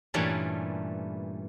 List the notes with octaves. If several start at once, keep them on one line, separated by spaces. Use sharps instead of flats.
G2 A#2 E3 G3 A3 C#4